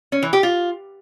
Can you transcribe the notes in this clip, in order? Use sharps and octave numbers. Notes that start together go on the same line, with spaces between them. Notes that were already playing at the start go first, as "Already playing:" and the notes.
C#4
E3
G4
F4